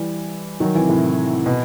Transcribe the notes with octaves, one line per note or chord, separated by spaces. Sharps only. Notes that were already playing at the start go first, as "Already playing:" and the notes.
Already playing: E3 G3
D#3 F#3
C3 E3
A2 C3
B2